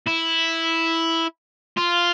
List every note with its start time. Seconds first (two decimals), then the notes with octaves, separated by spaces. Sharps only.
0.07 E4
1.77 F4